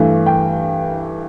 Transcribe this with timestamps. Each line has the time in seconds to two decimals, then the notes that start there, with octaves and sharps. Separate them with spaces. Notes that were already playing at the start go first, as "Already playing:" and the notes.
Already playing: G2 E3 A3
0.26 G5